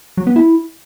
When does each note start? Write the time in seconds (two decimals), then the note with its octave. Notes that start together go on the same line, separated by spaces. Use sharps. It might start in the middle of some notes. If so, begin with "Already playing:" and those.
0.17 F#3
0.27 B3
0.36 E4